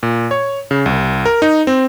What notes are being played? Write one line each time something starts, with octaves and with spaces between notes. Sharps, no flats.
A#2
C#5
C#3
C2
A#4
D#4
C4